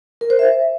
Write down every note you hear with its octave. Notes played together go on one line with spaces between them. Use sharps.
A#4
C5
E5